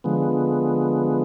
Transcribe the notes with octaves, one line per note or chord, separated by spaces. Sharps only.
D3 F3 G#3 B3